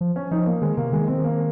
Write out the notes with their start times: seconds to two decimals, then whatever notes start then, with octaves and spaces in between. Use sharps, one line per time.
0.01 F3
0.16 C#4
0.31 F3 D#4
0.46 A#3
0.62 D#3 G#3
0.77 C3 A#3
0.92 D#3 G#3
1.08 C4
1.24 A#3